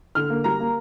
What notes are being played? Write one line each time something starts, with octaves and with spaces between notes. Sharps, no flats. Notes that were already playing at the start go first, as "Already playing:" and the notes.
D3 F6
A#3
G3 A#5
A#3